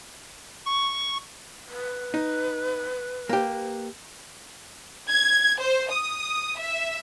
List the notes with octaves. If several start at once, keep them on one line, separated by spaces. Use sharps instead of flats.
C#6
B4
D#4
A#3 G4
G#6
C5
D#6
E5